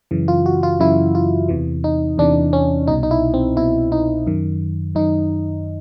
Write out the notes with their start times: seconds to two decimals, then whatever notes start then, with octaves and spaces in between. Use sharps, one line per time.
0.11 F#2 C#3 E3
0.28 F4
0.46 F#4
0.63 F4
0.80 F#2 C#3 E3 E4
1.15 F4
1.49 E2 C3 E3
1.84 D#4
2.18 E2 C3 E3 D4
2.53 C#4
2.87 C2 B2 D#4
3.03 D#4
3.11 E4
3.34 C4
3.56 C2 B2 E4
3.92 D#4
4.26 F#2 D#3
4.95 F#2 D#3 D#4